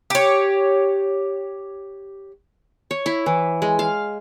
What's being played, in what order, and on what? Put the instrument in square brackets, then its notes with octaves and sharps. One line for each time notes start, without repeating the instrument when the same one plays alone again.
[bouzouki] G4 C#5
[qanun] C#5
E4
E3
G#3
F5